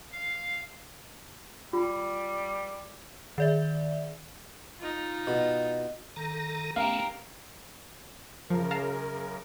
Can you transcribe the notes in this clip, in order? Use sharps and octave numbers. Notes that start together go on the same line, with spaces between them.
F5
G3 F4
D#3 D5 E5
D#4 F4
B2
D#3 A4 A#5
A3 B3 C#4 G4 A#4 F5
F#2 C#3 F3 A#4
F5 A5 A#5